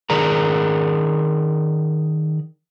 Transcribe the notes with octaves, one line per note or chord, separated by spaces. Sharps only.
D#3 G#4 A#4 D5 A#5